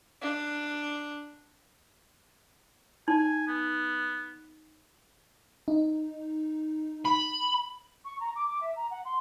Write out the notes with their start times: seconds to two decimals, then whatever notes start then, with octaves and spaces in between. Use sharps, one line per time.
0.21 D4
3.08 D#4 G#5
3.48 B3
5.68 D#4
7.05 B5
8.04 C#6
8.20 A#5
8.35 D6
8.47 D6
8.60 E5
8.76 A#5
8.90 F#5
9.04 C6